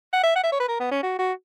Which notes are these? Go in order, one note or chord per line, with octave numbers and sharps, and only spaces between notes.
F#5
E5
F#5
E5
C#5
B4
A#4
B3
C#4
F#4
F#4